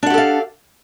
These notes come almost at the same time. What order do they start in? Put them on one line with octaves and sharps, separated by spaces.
D4 F#5 G4 A4 F5